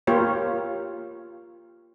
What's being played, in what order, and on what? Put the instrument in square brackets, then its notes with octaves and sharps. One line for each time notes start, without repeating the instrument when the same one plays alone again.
[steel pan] A#3 F4 G4 C#5